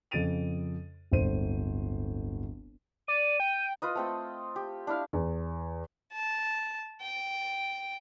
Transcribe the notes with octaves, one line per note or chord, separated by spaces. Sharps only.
F2 C#3 A6 D7 D#7 F7
D1 G1 G2 C5 D#7
D5 D#7
G5
F4 B4 D#5
A3 C4 A4
G4
D4 E4 F5
E2
A5
G5